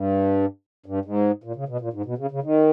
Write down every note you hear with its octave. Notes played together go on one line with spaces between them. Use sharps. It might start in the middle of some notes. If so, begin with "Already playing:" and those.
Already playing: G2
G2
G#2
A#2
C#3
B2
A#2
G#2
B2
C#3
C#3
D#3